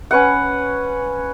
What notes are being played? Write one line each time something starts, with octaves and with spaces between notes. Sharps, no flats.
C#4 B4 F#5